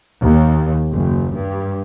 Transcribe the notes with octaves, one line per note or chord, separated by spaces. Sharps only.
D#2
F#1
G2